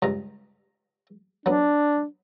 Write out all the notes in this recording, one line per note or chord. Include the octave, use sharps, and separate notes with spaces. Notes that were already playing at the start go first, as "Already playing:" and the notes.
C#2 G2 A#5
F#3 B3 D4